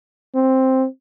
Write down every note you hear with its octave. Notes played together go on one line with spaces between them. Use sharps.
C4